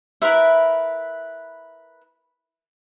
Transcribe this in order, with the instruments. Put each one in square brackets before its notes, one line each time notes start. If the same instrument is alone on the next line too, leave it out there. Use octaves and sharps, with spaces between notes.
[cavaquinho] E4 A#4 B4 E5